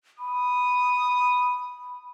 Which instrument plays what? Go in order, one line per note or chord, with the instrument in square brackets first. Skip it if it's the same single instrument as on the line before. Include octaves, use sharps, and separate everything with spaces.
[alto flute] B5 [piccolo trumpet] D#6